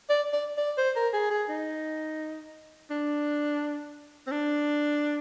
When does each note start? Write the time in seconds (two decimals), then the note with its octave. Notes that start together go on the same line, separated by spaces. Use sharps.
0.10 D5
0.33 D5
0.58 D5
0.78 C5
0.96 A#4
1.13 G#4
1.31 G#4
1.49 D#4
2.91 D4
4.27 C4
4.31 D4